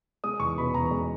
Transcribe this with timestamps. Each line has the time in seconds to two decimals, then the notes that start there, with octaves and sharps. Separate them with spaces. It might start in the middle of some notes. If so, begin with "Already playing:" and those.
0.24 G#3 D#6
0.40 E2 C#6
0.58 B2 B5
0.74 E2 A#5
0.91 G#3